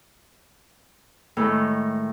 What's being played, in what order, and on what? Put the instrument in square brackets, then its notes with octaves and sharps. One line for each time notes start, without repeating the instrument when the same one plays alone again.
[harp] A2 D#3 G#3